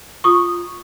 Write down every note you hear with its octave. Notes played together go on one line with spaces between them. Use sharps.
F4 C#6 D#6